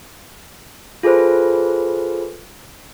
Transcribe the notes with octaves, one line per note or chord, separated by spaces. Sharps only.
F4 G#4 A4 B4 C5